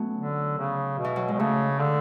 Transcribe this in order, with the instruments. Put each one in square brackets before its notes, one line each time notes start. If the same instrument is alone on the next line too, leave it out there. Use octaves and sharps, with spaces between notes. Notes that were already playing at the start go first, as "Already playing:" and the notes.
Already playing: [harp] F#3 A3 B3 C#4
[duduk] D3
C#3
B2
[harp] E3
F#3
[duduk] B2 [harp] G#3
[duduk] C#3 [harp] A3
[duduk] D3